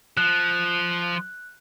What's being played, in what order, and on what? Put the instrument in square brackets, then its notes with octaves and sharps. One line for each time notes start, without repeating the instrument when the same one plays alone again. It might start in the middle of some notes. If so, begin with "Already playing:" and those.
[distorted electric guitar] F3 [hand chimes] F#6